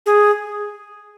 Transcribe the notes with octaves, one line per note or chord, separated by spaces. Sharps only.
G#4